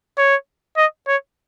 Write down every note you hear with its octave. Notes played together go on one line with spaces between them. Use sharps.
C#5
D#5
C#5